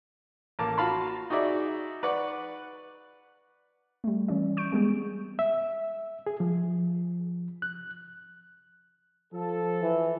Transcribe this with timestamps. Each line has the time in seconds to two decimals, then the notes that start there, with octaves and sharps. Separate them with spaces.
0.59 A1 A#3 A5 D6
0.78 F4 F#4 F5 A5 B5 C6
1.30 D#4 F#4 G#4 D5 E5
2.03 B4 D5 F#5 C#6
4.04 G3 A3
4.28 E3 C#4 D5
4.57 C#6 G6 D7
4.72 G3 G#3 B3 G#4
5.39 E5
6.27 G#4
6.40 F3
7.62 F#6
9.33 F3 A4
9.83 E3